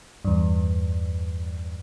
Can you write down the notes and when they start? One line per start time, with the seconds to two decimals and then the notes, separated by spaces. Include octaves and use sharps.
0.25 E2 G2